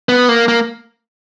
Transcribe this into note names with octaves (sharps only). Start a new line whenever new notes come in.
B3
A#3
A#3